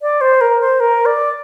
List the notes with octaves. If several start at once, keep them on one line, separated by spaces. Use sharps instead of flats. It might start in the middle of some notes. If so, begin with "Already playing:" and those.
D5
C5
A#4
C5
A#4
D5